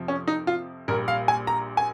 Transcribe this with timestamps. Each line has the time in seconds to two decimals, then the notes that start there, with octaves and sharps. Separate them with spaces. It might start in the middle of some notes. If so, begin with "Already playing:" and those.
Already playing: F2 C3 F3
0.08 C#4
0.28 D#4
0.47 F4
0.88 A#1 A#2 G3 A#4
1.08 F5
1.28 G#5
1.47 A#5
1.77 G#5